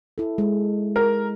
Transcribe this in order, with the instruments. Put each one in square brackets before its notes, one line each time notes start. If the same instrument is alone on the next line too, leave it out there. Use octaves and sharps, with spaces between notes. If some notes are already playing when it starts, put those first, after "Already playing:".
[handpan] E4 A4
G#3
[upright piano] A#4